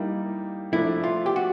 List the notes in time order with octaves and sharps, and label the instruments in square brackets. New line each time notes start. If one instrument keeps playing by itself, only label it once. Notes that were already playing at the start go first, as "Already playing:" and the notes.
Already playing: [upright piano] G3 A#3 D#4 [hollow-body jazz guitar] E4
[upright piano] F3 A3 D4 [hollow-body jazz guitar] E4
[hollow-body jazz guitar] F4
G4
F#4